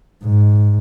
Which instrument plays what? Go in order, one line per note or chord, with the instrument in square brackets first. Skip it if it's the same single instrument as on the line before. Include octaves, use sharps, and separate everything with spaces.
[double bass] G#2